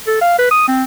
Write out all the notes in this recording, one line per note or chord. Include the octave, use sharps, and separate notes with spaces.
A4
F5
B4
D#6
C4